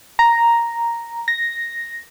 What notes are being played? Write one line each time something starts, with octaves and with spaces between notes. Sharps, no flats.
A#5
A#6